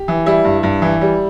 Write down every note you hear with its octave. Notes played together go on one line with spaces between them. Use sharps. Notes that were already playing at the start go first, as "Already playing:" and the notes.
Already playing: G4
E3
G3 E4
G2
G2
E3
G3